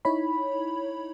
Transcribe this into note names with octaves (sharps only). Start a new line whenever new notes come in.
D#4 E4 C#5 B5